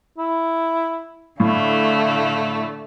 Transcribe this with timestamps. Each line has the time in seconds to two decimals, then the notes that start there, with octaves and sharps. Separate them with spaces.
0.18 E4
1.40 A2 D3 A3 F5